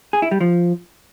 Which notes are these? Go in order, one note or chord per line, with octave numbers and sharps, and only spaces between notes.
G#4
E4
G3
F3